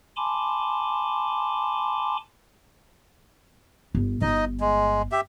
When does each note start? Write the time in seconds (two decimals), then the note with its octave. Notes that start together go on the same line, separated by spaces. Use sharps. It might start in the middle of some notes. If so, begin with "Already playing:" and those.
0.16 G#5 A5 B5 C6 D6
3.95 G1
4.22 G1 D#4 D#5
4.60 G#3
5.12 G4 E5